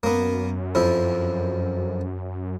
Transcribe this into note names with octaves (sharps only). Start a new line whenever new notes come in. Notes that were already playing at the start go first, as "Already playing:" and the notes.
F#2 A#3 B3
F2 F3 E4